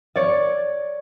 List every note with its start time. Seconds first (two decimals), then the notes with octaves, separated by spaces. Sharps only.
0.16 C#5 D5